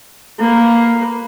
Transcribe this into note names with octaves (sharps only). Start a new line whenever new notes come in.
A#3 B4